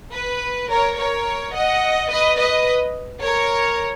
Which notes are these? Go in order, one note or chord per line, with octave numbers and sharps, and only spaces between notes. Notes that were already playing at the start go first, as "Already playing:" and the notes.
B4
A#4 C#5
A#4 C#5
D#5 F#5
B4 D#5
B4 D#5
A#4 C#5